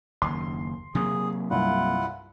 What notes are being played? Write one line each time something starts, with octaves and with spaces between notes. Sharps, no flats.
F#1 D#2 C6
C3 F#3 A#3 G#4
C2 G2 E4 F4 F#5